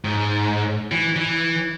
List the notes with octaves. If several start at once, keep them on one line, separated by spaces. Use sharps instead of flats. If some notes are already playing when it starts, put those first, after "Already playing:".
G#2
E3
E3